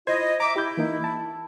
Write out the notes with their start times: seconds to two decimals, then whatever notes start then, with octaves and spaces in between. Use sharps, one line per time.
0.07 E4 F4 C5 D#5 G#6
0.40 E5 A#5 D6
0.56 E4 G4 G6
0.77 E3 A#3 D#4
1.04 A5